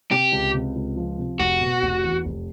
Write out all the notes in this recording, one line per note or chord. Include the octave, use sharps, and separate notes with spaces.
C3 G4
C#2
C3
C#2
F3
C3
F1 F#4
B2
F1
E2
F1